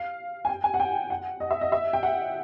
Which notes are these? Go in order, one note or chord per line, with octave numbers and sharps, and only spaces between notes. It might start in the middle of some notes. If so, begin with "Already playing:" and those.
Already playing: F5
G#5
G5
G#5
F#5
G5
F#5
D#5
E5
D#5
E5
G5
F#5